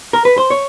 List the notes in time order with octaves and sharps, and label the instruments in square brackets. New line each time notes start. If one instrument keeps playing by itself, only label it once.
[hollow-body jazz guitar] A#4
B4
C5
C#5